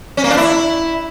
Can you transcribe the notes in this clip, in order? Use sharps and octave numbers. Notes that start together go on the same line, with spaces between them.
C#4
A#3
D4
E4